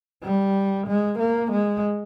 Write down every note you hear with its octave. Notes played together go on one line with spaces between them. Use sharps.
G3
G#3
A#3
G#3